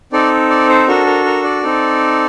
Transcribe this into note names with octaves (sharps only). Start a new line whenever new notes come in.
C4 D#4 A4 D5
D5
C5
D4 F#4 A4 A#4
A#4
A#4
D5
C4 D#4 A4